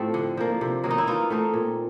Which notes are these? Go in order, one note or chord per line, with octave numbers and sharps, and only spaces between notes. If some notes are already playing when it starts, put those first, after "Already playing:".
Already playing: A2 F3 A3 C4 G4
D3
F3 A#3
C3
D#3 F#3 A#3
D#4
E4
E3 D#4 F4
A3 C4 D#4
A#2